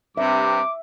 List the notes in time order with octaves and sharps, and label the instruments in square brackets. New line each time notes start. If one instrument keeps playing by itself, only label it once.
[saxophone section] G2 C3 [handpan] E5 [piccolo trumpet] D6